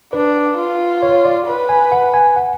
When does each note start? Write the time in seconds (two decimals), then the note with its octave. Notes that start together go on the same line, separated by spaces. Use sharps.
0.13 D4 B4
0.57 F4
1.02 C#5
1.25 D5
1.47 B4
1.69 G#5
1.92 F#5
2.14 G#5
2.36 F#5